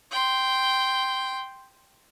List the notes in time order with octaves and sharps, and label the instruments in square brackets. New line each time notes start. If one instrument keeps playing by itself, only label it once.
[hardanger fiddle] G5 C6